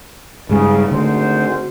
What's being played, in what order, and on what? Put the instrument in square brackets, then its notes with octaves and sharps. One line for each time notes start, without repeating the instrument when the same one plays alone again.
[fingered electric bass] G2 G3 G#3 [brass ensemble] C#3
[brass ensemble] G#1 F#4 C5 [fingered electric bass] D3 A3